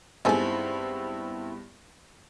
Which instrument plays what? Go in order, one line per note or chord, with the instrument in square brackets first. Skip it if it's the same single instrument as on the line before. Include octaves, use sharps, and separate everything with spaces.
[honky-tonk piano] G2 G#3 B3 [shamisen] D#3 A4 G#5 [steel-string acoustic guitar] C4 E4